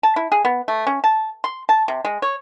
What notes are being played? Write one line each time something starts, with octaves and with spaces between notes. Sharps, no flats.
A5
E4
G#4
B3
A3
C#4
A5
C6
A5
C3
G#3
C#5